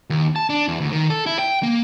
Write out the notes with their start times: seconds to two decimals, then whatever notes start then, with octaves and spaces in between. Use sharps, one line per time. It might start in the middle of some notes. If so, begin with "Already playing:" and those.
0.10 D#2
0.36 A5
0.50 D4
0.68 E2
0.81 D2
0.92 D#3
1.10 A4
1.26 E4
1.39 G5
1.63 A#3